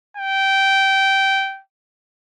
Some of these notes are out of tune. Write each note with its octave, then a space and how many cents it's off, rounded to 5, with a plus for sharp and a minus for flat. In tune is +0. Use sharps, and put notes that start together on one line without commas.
G5 -15